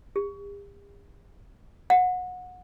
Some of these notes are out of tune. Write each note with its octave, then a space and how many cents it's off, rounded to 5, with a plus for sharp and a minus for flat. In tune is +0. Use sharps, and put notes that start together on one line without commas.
G4 +45
F#5 -25